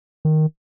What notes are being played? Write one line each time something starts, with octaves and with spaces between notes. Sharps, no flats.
D#3